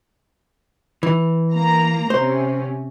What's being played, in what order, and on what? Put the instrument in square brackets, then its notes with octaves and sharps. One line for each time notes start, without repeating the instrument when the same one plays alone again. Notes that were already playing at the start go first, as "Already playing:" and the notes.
[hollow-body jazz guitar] E3
[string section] A#3 A#5
[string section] C3 C#4 [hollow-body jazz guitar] C5